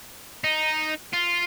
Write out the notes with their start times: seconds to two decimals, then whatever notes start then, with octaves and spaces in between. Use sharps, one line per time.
0.44 D#4
1.13 F4